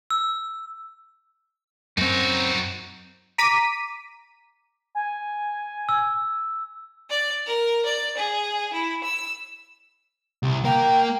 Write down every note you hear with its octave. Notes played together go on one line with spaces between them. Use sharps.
E6
F#2 C4 D#4 F#4
A#5 D6 B6 D#7
G#5
E6
D5
A#4
D5
G#4
E4
E6
C2
A#3 A#4 G5